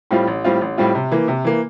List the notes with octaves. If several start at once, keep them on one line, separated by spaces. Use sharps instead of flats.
A2 G3 C4 F4
A1
A2 G3 C4 F4
A1
A2 G3 C4 F4
C3
E3 A#3
C3
E3 A#3